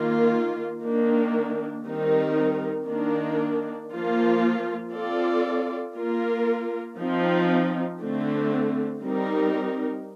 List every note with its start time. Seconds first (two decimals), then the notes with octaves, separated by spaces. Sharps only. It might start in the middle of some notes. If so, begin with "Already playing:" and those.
Already playing: D#3 A#3 F4
0.83 D#3 A#3 D4
1.85 D#3 G3 C4 D#4 A#4
2.88 D#3 A#3 D4
3.91 F3 A#3 F4
4.92 C4 F4 A4 D5
5.95 A#3 F4 A#4
6.98 F3 C4 D#4
8.00 D3 A3 C4
9.02 G3 C4 D#4 A#4